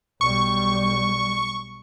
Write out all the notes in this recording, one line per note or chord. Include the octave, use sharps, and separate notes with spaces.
B1 G3 C#6